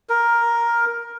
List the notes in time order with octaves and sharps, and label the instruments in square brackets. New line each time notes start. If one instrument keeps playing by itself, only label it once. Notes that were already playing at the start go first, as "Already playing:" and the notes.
[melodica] A#4